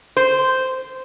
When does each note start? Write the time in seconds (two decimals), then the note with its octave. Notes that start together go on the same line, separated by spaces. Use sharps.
0.17 C5